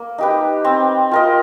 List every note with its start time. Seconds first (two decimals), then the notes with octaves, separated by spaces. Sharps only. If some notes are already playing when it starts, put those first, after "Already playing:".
Already playing: A#3
0.18 D#4 G4 B4
0.64 C4
1.11 F4 A#4 D#5